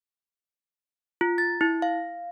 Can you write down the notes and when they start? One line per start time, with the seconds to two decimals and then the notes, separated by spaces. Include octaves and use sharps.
1.21 F4
1.38 A6
1.61 E4
1.82 F5